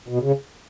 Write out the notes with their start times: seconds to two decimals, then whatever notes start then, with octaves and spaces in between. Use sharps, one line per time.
0.08 B2
0.22 C#3